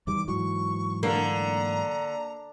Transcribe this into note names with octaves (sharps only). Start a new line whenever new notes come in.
E2 D#3 G3 D6
G#2 E3 F#3 C#6
D3 A#3 A#5